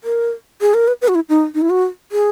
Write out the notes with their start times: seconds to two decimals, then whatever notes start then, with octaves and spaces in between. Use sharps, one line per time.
0.04 A#4
0.61 G#4
0.74 A#4
0.88 B4
1.02 B4
1.08 F#4
1.15 E4
1.29 D#4
1.55 D#4
1.62 E4
1.70 F#4
2.12 G#4